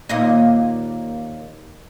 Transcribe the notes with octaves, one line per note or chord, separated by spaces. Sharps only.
D#2 A#2 D#5